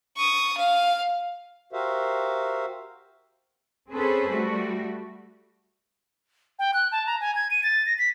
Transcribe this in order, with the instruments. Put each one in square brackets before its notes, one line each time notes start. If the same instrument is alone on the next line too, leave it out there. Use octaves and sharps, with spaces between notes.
[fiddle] C#6 D#6
F5
[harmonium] F#4 G4 A#4 C5 E5 F5
[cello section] C4 C#4 G#4 A4 B4 C5
G3 A3 F#4
[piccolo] G5
F#6
A5
A#5
G#5
G#6
D#7
A6
A#6
B6